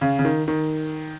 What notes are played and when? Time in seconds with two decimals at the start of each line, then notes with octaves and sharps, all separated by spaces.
0.01 C#3
0.19 C#3
0.25 D#3
0.48 D#3